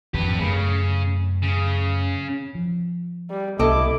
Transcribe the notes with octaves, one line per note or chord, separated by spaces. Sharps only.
G#1 F2 G4 B4
F#2 C#3 A3
C#3
F3
G3
C2 E4 A4 D#5 D6